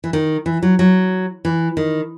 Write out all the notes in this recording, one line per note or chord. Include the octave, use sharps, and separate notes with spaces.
E3
D#3
E3
F#3
F#3
E3
D#3